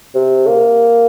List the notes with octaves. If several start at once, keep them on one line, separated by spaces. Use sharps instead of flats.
C3
A#3